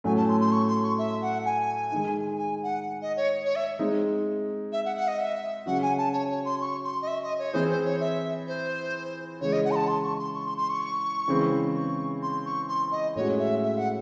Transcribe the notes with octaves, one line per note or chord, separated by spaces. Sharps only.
A2 F#3 A3 C#4 G#5
A5
C6
C6
C#6
C6
C#6
E5
F#5
G#5
D#3 G#3 D#4
G#5
F#5
D#5
C#5
C#5
E5
G#3 C4 D#4
E5
F#5
F#5
D#5
E5
C#3 F#3 C#4 F#4 F#5
G#5
A5
C#5
C#5
C6
C#6
C6
D#5
E5
D#5
C#5
E3 C4 E4 G#4 C5
C5
C#5
E5
C5
C#3 E3 G#3 C#5
D#5
F#5
C6
A5
C6
C#6
C6
C#6
C6
C6
C#6
C#3 E3 G#3 C4
C#6
C6
C#6
C6
D#5
A2 G#3 C#4 F#4 C#5
E5
E5
F#5